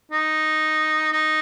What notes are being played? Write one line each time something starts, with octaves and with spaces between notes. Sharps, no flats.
D#4
D#4